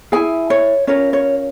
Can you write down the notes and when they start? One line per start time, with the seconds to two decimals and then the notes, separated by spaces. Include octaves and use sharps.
0.12 E4 G#4 G#5
0.50 C#5
0.87 C#4 F4 A#4 C#5
1.13 C#5